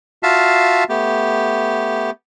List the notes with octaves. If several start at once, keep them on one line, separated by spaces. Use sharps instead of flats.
F4 F#4 E5 F5 A5
A3 B3 G4